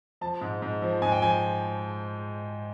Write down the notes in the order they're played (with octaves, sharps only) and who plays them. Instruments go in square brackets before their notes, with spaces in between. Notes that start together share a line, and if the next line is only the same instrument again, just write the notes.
[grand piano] F3 A5
G#2
G#2
F3
G#2 G#5
G5
F3 G#5